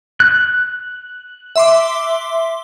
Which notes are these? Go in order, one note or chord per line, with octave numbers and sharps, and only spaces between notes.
F#6
E5 C6 D6